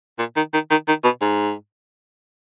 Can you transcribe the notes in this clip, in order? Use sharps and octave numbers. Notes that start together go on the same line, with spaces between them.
A#2
D#3
D#3
D#3
D#3
B2
G#2